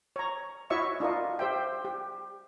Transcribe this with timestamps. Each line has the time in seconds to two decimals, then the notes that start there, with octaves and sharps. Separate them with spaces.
0.16 C#5 A#5
0.70 E4 F#4 C#5 D#5 E5 C#6
1.00 D4 F4 A#4 D#5
1.39 G4 C5 E5 G5
1.85 G4